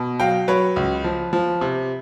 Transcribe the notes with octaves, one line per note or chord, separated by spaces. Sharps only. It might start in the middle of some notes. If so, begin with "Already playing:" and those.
Already playing: B2
F#3 F5 G5
F#3 B4 C#5
C#2
F3
F3
C3